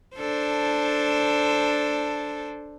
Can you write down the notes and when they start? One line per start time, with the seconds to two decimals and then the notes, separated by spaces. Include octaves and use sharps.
0.17 D4 A4 C5